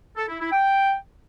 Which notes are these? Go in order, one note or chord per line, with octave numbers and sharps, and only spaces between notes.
A4
E4
E4
G5